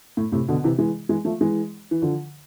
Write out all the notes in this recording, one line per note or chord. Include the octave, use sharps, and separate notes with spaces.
A2
A2 C3
B2 D3
C3 E3
E3 G#3
E3 G#3
F3 A3
E3 G#3
E3
D3 F3